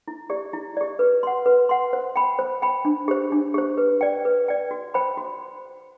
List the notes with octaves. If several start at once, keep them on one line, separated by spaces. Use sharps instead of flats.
E4
G4 D5
E4
G4 D5
B4
F#5 C6
B4
F#5 C6
C5
G5 B5
C5
G5 B5
D4
G4 C5
D4
G4 C5
B4
D5 G5
B4
D5 G5
F#4
C5 G5 B5
F#4